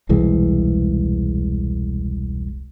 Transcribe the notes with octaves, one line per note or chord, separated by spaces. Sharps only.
E1 C2 E3 G#3